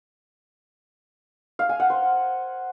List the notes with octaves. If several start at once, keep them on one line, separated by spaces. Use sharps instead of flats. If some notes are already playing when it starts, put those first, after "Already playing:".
F5
G#5
F#5
C5